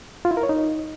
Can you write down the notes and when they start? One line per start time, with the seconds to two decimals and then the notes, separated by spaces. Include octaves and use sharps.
0.25 F4
0.31 E4
0.37 A#4
0.43 C#5
0.49 D#4